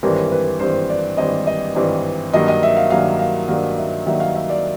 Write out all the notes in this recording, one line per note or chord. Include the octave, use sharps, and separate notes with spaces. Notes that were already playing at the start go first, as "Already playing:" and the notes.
G#1 G2 E3 G3 A#4
B4
G#1 G2 E3 G3 C5
D5
G#1 G2 E3 G3 D#5
D#5
G#1 G2 E3 G3
G2 D#3 F#3 A#3 D#5
D#5
E5
F5
G2 D#3 F#3 A#3 F5
F5
G2 D#3 F#3 A#3 F5
E5
G2 D#3 F#3 A#3 E5
F5
E5
D5